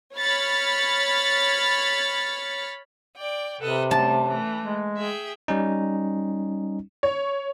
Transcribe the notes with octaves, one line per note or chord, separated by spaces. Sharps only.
C#5 B5 F6 A6 C#7
D5 G5
C3 A4 B4 D#5
F#2 G3 A3 A5
E3 A3
G#3
G#4 E5 G5
G3 C#4 D#4
C#5